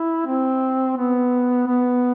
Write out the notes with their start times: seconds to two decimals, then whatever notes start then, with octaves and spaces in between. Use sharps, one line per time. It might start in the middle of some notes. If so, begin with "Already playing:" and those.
Already playing: E4
0.26 C4
0.97 B3
1.67 B3